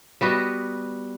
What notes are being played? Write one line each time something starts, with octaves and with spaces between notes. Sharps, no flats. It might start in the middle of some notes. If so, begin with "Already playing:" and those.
G3 B3 F#4 D#5